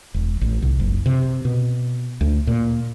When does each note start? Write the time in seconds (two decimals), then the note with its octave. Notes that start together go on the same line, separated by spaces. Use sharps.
0.14 E1
0.41 A1
0.62 C2
0.80 F#1
1.06 C3
1.45 B2
2.21 D2
2.47 A#2